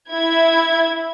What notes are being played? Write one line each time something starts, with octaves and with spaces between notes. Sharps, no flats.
E4 G#6